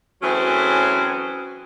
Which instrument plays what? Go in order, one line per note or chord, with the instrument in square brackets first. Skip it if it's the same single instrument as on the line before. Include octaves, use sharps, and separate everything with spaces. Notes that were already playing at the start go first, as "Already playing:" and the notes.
[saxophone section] E3 F#3 A3 C4 C#4 G#4